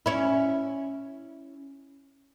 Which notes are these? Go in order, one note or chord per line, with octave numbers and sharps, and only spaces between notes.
C#4 E4